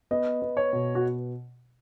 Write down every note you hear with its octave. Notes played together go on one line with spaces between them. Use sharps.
B3 D#5
B3
C#5
B2
F#4